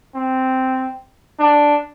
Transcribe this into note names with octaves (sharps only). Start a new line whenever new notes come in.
C4
D4